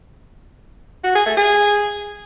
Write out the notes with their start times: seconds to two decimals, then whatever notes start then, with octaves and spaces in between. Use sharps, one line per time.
1.04 F#4
1.15 G#4
1.26 A3
1.37 G#4